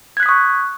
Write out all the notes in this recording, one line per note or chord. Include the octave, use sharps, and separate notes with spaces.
C#6 D#6 F#6 G#6 B6